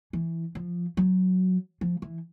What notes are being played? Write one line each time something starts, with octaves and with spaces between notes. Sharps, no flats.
E3
F3
F#3
F3
E3